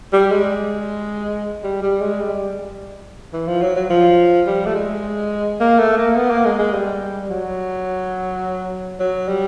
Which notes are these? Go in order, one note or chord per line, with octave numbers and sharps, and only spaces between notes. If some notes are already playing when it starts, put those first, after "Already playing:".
G3
G#3
G3
G3
G#3
G3
E3
F3
F#3
F#3
F3
G3
A3
G#3
A#3
A3
A#3
B3
A#3
G#3
G#3
G3
F#3
F#3
G3